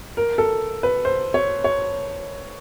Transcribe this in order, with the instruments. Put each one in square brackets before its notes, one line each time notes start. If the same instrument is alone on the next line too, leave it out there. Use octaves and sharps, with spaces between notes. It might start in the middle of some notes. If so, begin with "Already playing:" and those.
[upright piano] A#4
A4
B4
C5
C#5
C#5